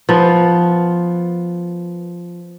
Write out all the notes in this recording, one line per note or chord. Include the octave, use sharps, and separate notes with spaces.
F3 B3